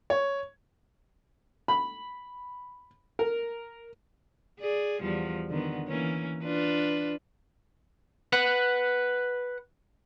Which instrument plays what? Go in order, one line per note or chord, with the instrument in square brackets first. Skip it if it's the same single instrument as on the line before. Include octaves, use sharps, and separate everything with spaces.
[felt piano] C#5
[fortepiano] B5
A#4
[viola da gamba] G#4 D5
E2 F3 G3
D3 D#3 B3
E3 A#3 C#4
D4 F4 B4
[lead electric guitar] B4 F#5